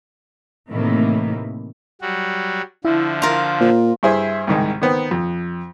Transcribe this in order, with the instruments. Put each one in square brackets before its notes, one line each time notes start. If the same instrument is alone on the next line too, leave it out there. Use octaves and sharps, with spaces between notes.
[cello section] A2 C3 D#3 E3 A3 A#3
[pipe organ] F#3 G3 F#4
[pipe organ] D3 F3 [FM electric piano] E4 E5
[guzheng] F4 A#4
[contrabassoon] A#2 [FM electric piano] C5
[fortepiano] G2 E4 G#4 C5 E5
C2 G#2 D#3 G#3
D#3 B3 C4
F2